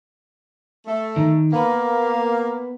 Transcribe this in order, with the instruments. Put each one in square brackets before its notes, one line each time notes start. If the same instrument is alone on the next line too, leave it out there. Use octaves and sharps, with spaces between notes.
[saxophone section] A3
[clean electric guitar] D#3
[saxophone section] A#3 [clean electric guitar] B3 B4